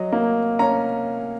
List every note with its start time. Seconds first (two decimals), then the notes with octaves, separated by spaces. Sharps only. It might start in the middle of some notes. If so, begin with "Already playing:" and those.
Already playing: F#3 D#5
0.12 A#3
0.59 C#4 A#5